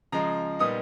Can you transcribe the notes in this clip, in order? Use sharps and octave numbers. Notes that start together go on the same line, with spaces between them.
C#3 F3 G#3 A#5
A#2 G3 B3 D#4 D#6